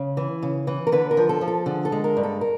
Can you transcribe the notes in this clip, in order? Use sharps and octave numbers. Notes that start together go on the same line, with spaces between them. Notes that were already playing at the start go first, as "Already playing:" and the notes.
Already playing: C#3
E3
C#3
E3
A#4
D3 B4
A#4
F3
A4
F3
A4
D3 G#4
A4
G#3
A#4
G2
A4
A#4